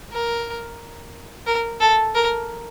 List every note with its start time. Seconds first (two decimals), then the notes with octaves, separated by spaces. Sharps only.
0.12 A#4
1.46 A#4
1.80 A4
2.15 A#4